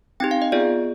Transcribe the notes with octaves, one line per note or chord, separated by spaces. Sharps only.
C4 D#4 G4 G5
F5
D#5
B3 F4 G#4 D5